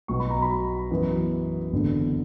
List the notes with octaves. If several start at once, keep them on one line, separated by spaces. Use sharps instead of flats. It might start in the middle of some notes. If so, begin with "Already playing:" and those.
B1 B2 F#3 C#6
B5
A#5
B5
F#2 E3 B3
F#1 E2 D3